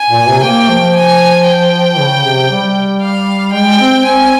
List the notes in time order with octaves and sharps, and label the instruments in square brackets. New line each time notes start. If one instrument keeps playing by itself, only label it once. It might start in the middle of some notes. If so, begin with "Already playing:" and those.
Already playing: [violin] G#5
[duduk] A#2
C3
[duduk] A#3 [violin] G5
[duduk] F3
[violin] G#5
G5
[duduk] C#3
C3
G3
[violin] F5
[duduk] G#3 [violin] G5
[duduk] C4
[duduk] C4 [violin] G#5